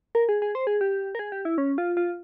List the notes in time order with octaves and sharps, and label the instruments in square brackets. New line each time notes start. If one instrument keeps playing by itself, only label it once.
[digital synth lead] A#4
G#4
G#4
C5
G#4
G4
A#4
G#4
G4
E4
C#4
F4
F4